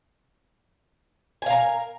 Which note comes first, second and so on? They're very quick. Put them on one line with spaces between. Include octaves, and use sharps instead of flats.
G#5 F5 A#4